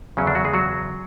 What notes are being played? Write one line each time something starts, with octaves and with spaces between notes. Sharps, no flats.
E2 C#3 F#3 C#4
D3 D4
F#3 F#4
G#3 G#4
F#3 F#4